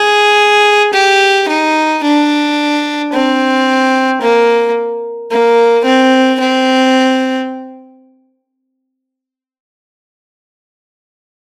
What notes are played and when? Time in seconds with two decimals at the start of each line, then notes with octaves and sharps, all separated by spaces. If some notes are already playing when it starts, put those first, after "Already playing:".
Already playing: G#4
0.94 G4
1.48 D#4
2.03 D4
3.12 C4
4.22 A#3
5.31 A#3
5.85 C4
6.40 C4